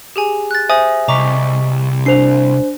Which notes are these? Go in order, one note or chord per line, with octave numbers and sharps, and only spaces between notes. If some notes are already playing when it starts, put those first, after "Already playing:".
G4 G#4 G#5
F#6 A6
C5 E5 G#5 D#6
C2 D#5 A#5 C#6 D6 B6
D4 C5 C7 F7